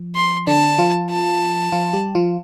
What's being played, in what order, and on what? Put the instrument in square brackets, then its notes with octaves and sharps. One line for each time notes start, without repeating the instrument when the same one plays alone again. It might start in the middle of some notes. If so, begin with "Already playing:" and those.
Already playing: [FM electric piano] F3
[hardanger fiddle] C6
[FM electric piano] D3 D4 [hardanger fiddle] A5
[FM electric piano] F3 F4
[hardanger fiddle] A5
[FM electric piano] F3 F4
G3 G4
F3 F4